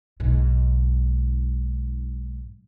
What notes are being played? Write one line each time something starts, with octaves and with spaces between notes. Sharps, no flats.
B1 G#2